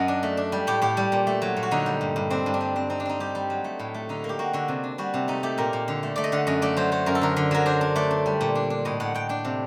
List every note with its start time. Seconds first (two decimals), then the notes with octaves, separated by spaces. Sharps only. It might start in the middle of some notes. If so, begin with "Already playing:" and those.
Already playing: F#2 D#5 F#5
0.08 D4
0.23 A3
0.37 D4
0.52 G3
0.67 A2 G4
0.81 A2 G4
0.97 G3
1.12 A#2
1.27 A3
1.42 F#3
1.56 A#2
1.63 F#4
1.71 D3 D#4
1.86 G3
2.01 G2
2.16 G2
2.30 C4 D4
2.46 G2
2.54 D4
2.61 G3
2.76 C4
2.90 C4 D#4
3.00 D4
3.05 C4 D#4
3.20 G3 G4
3.35 G3
3.50 F#3
3.64 A3
3.79 A2
3.94 A3
4.09 D3 D#4
4.24 A#3
4.29 G4
4.39 A#3 F#4
4.53 D3 F#4
4.68 C3
4.83 D4
4.98 G3 F#4
5.14 C3
5.28 A3 D#4
5.43 A3 G4
5.58 A#2 A#4
5.73 A#2
5.88 D3
6.03 A3
6.16 A3 D5
6.24 D#5
6.32 D3 F#5
6.47 F#2 D#5
6.62 A3 D5
6.77 F#3 C5
6.92 A3 C5
7.06 F#2 A#4
7.15 A4
7.22 D3 A#4
7.36 D3
7.51 F#3 A#4
7.66 D4 C5
7.81 D4
7.96 A3 D5
8.11 D4
8.26 G3
8.41 A#2
8.55 D4
8.70 D4
8.85 A2 D#5
9.00 A2 F#5
9.14 A2 G5
9.29 D4 G5
9.45 C3